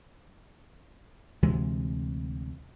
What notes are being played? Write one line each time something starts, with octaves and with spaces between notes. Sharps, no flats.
D2 C3 E3 G#3